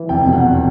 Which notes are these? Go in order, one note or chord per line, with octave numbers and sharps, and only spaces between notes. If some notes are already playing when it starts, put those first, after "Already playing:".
Already playing: E3
F1 G5
B2
F#5
E2